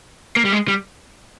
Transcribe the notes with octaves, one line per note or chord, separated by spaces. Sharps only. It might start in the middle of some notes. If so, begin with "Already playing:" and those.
A#3
G3
G#3
G3